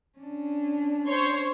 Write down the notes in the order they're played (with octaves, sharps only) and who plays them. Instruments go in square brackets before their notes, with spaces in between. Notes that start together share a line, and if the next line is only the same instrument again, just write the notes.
[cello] C#4 D4
[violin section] C5 C#5 C6